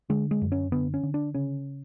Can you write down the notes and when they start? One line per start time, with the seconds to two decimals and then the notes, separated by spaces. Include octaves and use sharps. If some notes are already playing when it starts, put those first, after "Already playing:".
0.10 D3 G#3
0.31 G#3
0.42 F#2
0.52 C#4
0.72 D3 B3
0.94 C#4
1.03 D3
1.14 D4
1.35 C#3 C#4